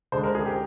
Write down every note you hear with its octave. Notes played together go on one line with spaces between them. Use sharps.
D2 D3 G#3 D4 C5
A#4
G#4
G4